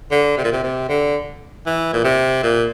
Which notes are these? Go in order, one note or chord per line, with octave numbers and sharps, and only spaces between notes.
D3
C3
A#2
C3
C3
D3
E3
A#2
C3
A#2